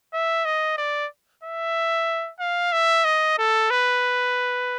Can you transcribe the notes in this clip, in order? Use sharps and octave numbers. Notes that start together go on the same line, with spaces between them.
E5
D#5
D5
E5
F5
E5
D#5
A4
B4